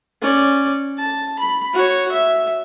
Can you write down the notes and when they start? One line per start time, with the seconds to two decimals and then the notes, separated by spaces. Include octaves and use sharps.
0.22 C#4 D5
0.98 A5
1.39 B5
1.73 F#4 C#5
2.12 E5